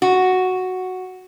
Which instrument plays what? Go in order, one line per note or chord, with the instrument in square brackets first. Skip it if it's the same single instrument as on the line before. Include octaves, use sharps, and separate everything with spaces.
[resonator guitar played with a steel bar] F#4